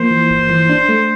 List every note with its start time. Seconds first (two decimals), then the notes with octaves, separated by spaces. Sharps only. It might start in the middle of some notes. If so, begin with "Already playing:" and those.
Already playing: F3 A#3 C5
0.11 E3
0.30 G1
0.50 E3
0.69 D4
0.89 A3